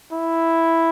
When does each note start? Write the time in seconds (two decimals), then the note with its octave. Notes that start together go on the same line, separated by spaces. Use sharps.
0.12 E4